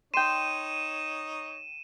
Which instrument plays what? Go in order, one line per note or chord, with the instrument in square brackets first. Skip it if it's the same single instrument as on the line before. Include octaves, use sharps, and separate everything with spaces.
[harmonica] D#4 C#5 [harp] G5 C6 [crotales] D#7 E7